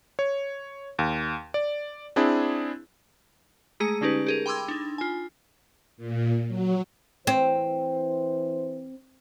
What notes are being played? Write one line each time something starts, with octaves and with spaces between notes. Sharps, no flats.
C#5
D#2
D5
C4 D4 E4 G#4
G#3 A3 G#4 A#5 C#7
D3 G#3 C#4 D#4 G4 B4
G4 G#4 A#4
G5 B5 C6 D6 E6 G#6
D4 D#4
F4 G#5
A#2
F#3
E3 C4 C5